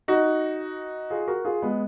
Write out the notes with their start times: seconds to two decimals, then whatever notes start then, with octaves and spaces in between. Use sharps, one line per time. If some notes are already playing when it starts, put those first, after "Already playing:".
0.08 D#4 F#4
1.10 F4 G#4
1.28 F#4 A#4
1.45 F4 G#4
1.62 G#3 B3